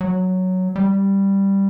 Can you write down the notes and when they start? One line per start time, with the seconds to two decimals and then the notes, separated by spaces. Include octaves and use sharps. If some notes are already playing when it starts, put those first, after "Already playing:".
0.01 F#3
0.76 G3